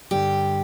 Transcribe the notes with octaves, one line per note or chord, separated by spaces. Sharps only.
G2 D3 G3 G4